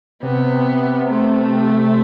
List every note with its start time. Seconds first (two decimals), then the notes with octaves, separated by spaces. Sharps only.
0.22 C3 B3
1.09 A3